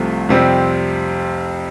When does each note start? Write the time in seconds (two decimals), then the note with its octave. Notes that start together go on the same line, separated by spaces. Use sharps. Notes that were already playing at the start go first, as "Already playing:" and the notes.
Already playing: C2 C3 F3 A3
0.29 F2 C3 G3 C4